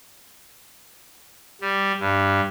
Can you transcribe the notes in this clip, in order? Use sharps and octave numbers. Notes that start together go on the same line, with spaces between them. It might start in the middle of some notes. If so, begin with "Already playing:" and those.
G3
G2